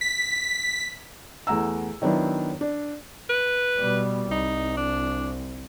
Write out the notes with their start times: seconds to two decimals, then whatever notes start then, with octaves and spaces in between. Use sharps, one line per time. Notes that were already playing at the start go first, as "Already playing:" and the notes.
0.01 B6
1.47 E2 A3 F#5 A#5 E6
2.02 D#3 F#3 B3 D4 E4
2.61 D4
3.30 B4
3.79 B2 G3
4.31 C2 D#4
4.77 D4